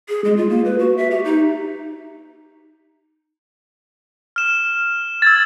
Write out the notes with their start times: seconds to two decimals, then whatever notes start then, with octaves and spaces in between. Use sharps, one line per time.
0.09 G#4
0.24 G#3
0.37 F4
0.49 A#3
0.65 B4
0.79 F#4
0.97 E5
1.11 G4
1.25 D#4
4.36 F6 E7
5.22 E6 G#6 A6